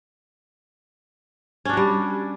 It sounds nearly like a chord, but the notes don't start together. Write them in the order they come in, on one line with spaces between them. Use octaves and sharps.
C#4 D4 F#4 G3